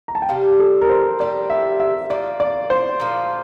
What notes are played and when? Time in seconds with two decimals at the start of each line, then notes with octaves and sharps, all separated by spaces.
0.08 A#5
0.15 A5
0.22 G5
0.29 C3 G3 D4 G4 F5
0.60 A4
0.81 A#4
0.89 C5
1.19 C3 G3 D4 G4 D5
1.50 E5
1.80 E5
2.10 A#2 F3 A#3 D5
2.40 D5
2.70 C5
3.00 A#2 F3 A#3